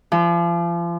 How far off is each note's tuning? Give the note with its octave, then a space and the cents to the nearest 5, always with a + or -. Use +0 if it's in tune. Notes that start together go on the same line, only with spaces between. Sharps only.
F3 -35